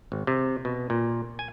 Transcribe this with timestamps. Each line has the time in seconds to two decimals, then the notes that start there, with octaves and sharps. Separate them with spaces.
0.12 G#1
0.27 C3
0.65 B2
0.90 A#2
1.39 G#5